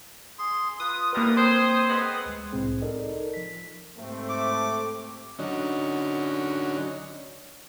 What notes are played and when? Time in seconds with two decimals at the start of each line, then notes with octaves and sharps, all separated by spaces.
0.39 G#4 C6
0.80 F4 B4 D#6
1.13 D3 E3 G3 A#3 A#4 B4
1.36 C4 C5 C#5
1.89 G#3 B3
2.26 D2 G#3
2.52 C2 A2 C3 C4 G#4
2.82 D#4 A4 A#4 D5 D#5
3.34 F3 B6
3.98 G#2 C3 A3 C4
4.30 D6
5.39 D3 F#3 C#4 D#4